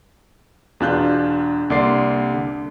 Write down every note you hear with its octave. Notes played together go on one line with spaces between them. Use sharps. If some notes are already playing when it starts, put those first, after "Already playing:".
E2 B2 D4 F4 F#6 G6
C2 D3 A#3 D5 C6 C7
D3